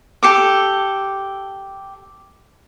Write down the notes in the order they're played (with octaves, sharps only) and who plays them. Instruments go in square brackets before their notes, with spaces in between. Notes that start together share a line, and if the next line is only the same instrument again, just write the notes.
[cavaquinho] G4 A4 D6